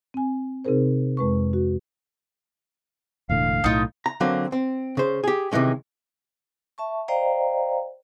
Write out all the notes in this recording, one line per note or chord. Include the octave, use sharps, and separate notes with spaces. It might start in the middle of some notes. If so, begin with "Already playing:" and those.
C4 G#5
C3 C4 D#4 G#4 A#4 C5
F2 G#3 B4 C#6
F#4
E1 A2 D3 F5
B1 A2 D#4 F4
A#5
D3 F#3 A#3 C4
C4
C#3 C5
G4 G#4
C3 D#3 E3 G#3 C#4
E5 A5 C#6
C5 D5 D#5 F5 G5 A#5